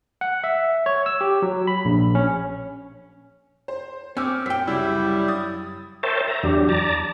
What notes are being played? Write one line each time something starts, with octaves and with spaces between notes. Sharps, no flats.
F#5
E5
C#5
E6
G4
F#3
B5
A#1
C#4
C5
C4 C#4 D6 E6 F6
F#2 G5 B6
C2 C#3 G3 E4
D#6 A6
A#4 C5 C#5 E5 G5 A5
E5 A#5
E2 F#3 D4 G4
D5 A5 A#5